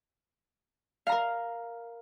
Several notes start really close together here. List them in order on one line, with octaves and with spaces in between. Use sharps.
F5 A#5 A#4